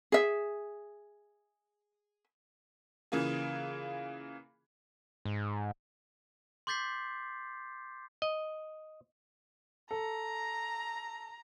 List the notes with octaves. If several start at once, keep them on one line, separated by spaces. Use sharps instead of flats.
G#4 E5
C#3 E3 A#3 F4 G#4
G#2
C6 D6 G6 A6 B6 C7
D#5
A4 A#5